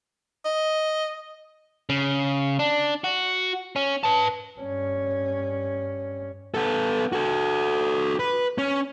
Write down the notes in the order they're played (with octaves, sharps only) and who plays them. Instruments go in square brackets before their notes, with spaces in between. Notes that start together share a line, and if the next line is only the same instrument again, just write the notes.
[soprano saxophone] D#5
[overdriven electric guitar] C#3
D4
F#4
C#4
B4 A5
[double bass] G2 C#4
[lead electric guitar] B3 A4
F#4 A4
B4
C#4